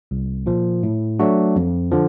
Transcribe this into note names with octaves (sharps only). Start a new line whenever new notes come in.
C2
A#2 F3
A2
F#3 A3 D4 F#4
F2
D3 F3